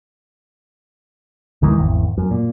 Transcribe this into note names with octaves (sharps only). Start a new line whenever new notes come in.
D2 D#3 E3 G#3
G#1 E2
F#2
A#2